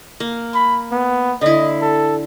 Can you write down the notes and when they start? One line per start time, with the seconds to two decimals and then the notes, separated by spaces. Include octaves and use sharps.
0.20 A#3
0.55 B5
0.92 B3
1.41 D3 E4 D#5
1.81 A4